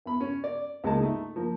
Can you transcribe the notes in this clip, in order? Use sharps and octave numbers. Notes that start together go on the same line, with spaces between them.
E2 B5
C#4
D5
C#2 G#3 A#3 A5
A3 D#4
F3 A#3